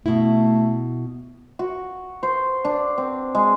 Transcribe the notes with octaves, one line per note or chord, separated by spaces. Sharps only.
B2 A3 E4
F#4
C5
D4
C4
G#3